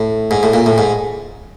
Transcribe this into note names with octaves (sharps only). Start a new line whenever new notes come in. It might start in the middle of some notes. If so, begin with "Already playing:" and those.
Already playing: A2
G#2
A2
A#2
A2
G#2